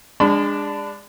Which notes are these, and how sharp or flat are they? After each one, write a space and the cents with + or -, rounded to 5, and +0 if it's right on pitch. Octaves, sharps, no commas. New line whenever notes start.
G#3 -25 D4 +0 B5 +40